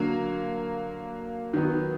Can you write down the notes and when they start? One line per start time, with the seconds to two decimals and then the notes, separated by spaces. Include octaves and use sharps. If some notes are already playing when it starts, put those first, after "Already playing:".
Already playing: D3 F#3 A#3
1.53 D#3 F#3 B3